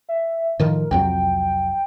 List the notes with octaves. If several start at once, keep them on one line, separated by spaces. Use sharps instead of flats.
E5
A2 D#3 F3 A#4
C2 F2 F#3 G5